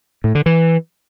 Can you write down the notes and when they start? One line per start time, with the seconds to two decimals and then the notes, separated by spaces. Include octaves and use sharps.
0.24 A2
0.35 D3
0.46 E3